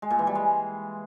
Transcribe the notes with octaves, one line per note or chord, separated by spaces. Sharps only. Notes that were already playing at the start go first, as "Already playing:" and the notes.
G#3
A#2
E3
G3
G#3